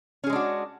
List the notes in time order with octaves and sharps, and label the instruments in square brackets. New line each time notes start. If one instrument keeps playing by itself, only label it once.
[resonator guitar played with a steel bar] C#4
G#4
G#3
D4
F#4